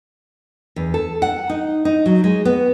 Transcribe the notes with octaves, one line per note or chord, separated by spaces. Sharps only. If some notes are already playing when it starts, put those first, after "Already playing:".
E2
A4
F#5
D#4
D#4
F#3
G#3
B3